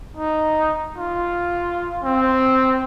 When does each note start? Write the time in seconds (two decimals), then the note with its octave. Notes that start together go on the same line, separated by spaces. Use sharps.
0.17 D#4
0.98 F4
2.04 C4